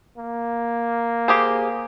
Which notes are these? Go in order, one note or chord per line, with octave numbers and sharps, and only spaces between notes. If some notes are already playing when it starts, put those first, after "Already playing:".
A#3
G4 G#4 C5